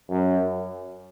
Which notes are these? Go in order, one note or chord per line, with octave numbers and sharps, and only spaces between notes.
F#2